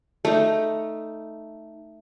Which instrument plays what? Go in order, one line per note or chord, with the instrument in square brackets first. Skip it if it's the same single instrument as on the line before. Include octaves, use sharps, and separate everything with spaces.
[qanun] A3 D#4